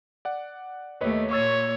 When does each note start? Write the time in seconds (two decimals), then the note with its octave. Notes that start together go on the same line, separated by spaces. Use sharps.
0.25 D5 F#5
1.01 D#2 A3 B4 C#5 D#5
1.31 A#2 A#3 C#5 C#6 E6 A6